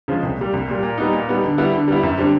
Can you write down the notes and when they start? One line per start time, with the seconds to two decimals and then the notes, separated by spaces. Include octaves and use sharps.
0.08 C#3 F3 G#3
0.23 C2
0.38 A#2 G3
0.53 C2
0.68 A#2 G3
0.83 A#2
0.98 G3 B3 D#4
1.13 A#2
1.28 G3 B3 D#4
1.43 D3
1.58 G3 B3 E4
1.73 D3
1.88 G3 B3 E4
2.03 F#2
2.18 D3 G3 C4